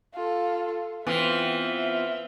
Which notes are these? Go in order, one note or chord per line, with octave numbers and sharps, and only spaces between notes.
F4 A4
E3 B3 C4 F4 E5